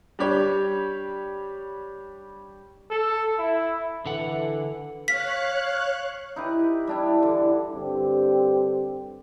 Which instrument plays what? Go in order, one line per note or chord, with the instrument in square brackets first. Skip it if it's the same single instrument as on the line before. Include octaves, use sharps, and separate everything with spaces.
[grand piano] G3 D4 G4 C#5
[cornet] A4
E4
[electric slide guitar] D3 F#5 [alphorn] E3 [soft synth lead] A4
[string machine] C#5 F#6 [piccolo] F5 [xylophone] B6
[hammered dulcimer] D#4 E4 G4 B4
G3 D4 E4
D3 E3
[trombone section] G2 D3 C4 G4